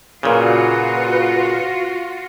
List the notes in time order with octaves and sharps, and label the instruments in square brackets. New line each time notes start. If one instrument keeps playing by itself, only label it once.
[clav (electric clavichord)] A#2 C#3 [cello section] F4 F#4 [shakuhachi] B4